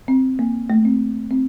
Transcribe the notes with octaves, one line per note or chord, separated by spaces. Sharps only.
C4
A#3
A3
C4
C4